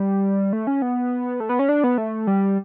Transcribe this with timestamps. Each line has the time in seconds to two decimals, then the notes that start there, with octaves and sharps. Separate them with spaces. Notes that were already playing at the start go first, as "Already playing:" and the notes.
Already playing: G3
0.53 A3
0.67 C#4
0.82 B3
1.40 A3
1.49 B3
1.59 C#4
1.69 D4
1.84 B3
1.98 A3
2.27 G3